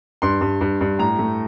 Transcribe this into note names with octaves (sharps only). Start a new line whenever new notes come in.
G2 C6
G2
G2
G2
A2 A#5
A3